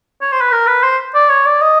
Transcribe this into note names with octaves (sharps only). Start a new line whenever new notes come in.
C#5
C5
B4
A#4
B4
C5
D5
C#5
D5
D#5